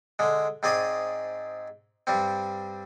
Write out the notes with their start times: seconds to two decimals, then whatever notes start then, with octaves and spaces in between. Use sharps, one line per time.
0.19 D3 G#3
0.63 G#2 C4 G#4 D5 D#5 D#6
2.07 G2 G3 C4